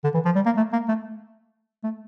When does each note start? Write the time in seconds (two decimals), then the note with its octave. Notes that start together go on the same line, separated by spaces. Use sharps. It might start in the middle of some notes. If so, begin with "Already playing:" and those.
0.04 D3
0.14 E3
0.25 F3
0.35 G3
0.46 A#3
0.57 A3
0.73 A#3
0.88 A3
1.84 A3